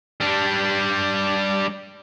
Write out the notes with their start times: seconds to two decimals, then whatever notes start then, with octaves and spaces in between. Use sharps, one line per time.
0.21 G3 D4